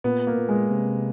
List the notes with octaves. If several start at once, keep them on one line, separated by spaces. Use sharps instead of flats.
A#2 B3
A#3
A#2
G#3
C3